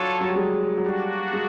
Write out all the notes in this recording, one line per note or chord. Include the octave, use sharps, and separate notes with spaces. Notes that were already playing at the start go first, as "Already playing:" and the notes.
Already playing: F#3 D4 F4 A4 C#5
F#3
G3
G#3
F#3
G3 A#3 D4 F#4
G#3